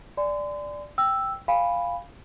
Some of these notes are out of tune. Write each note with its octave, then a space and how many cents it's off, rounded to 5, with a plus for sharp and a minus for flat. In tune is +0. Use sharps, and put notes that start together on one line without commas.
D5 +0 G#5 -5 C6 -40
G5 +0 E6 +0
F5 +0 G#5 -40 B5 +0